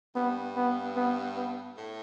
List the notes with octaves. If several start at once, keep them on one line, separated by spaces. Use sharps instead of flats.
G2 B3
B3
B3
B3
A2